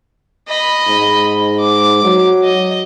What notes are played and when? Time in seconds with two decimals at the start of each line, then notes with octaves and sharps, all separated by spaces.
0.48 D#5 B5
0.88 G#2
1.60 D6
2.04 F#3
2.44 D#5